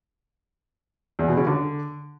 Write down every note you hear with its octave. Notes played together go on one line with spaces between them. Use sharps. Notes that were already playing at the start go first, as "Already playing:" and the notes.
E2
B2
C#3
D3